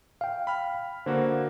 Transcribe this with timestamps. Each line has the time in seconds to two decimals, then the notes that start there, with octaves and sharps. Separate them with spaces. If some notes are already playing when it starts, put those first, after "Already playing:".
0.21 F5 G5
0.47 B5 F6
1.06 D3 A#3 F#4 C5